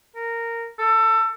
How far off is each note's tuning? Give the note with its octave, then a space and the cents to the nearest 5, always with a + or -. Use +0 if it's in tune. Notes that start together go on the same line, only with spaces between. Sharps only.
A#4 -10
A4 +20